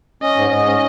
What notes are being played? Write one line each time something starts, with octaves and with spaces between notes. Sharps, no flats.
C#4 D#5
G#2
G#2 D#5
C#4